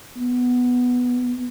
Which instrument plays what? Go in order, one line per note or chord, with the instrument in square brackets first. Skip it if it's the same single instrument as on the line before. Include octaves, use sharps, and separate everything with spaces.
[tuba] B3